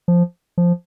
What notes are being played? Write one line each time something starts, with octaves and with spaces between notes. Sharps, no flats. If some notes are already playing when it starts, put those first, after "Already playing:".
F3
F3